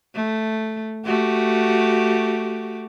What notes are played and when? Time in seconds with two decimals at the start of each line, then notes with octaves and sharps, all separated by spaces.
0.14 A3
1.05 A3 F#4 G4